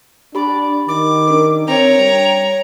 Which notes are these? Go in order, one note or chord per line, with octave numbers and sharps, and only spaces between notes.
D4 G4 D5 B5
D#3 D6
D4 A#4
C4 C#5 G5 A#5
G3